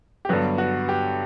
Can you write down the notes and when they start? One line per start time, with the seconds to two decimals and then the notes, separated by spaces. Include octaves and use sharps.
0.25 G4
0.29 G2 D3 F#3 B3 F#4
0.58 F#4
0.89 G4